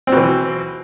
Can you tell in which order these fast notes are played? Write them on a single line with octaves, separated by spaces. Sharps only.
C4 B2 E3